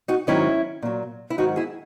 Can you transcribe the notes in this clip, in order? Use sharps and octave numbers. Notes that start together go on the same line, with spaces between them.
D#4 F#4
G#2 D#3 F#3 C#4 E4
A#2 F#3
E4
G#2 D#3 F#3 D#4 F#4
E4 G#4